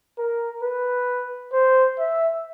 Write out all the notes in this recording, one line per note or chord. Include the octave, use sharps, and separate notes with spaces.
A#4
B4
C5
E5